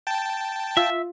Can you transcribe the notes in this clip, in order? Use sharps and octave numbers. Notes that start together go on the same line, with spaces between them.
G5 A5
F4 E5 E6